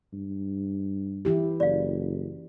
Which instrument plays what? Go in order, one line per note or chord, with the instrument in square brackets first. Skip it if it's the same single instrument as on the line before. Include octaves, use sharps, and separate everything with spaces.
[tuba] G2
[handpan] E3 E4 G4
[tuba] F#1 [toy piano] D5 F5